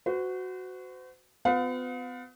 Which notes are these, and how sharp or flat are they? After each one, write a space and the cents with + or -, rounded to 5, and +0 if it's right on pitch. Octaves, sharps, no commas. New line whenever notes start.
F#4 +0 C5 -40
B3 +40 F4 +30 F5 +45